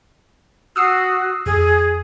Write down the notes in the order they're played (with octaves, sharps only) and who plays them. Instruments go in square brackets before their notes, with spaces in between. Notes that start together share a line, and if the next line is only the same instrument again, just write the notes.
[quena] F#4 [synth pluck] D#6 E6 C7
[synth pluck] F2 [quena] G#4